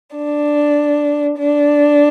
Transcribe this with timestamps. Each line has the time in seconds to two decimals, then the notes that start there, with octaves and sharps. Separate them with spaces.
0.15 D4
1.37 D4